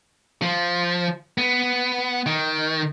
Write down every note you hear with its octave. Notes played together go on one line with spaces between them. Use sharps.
F3
B3
D#3